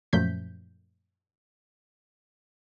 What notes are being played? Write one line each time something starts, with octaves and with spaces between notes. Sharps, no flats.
F#2 A#2 F3 A3 G6 B6